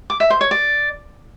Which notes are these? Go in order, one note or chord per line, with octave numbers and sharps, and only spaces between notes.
D6
E5
C5
C#5
D5